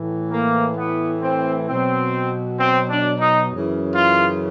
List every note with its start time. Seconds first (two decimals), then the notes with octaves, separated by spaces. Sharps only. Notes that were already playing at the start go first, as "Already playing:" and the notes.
Already playing: A2 E3
0.32 A#3
0.77 B3
1.22 C4
1.68 B2 F#3 C4
2.59 C4
2.90 D4
3.20 D#4
3.50 F#2 C#3 E3
3.95 F4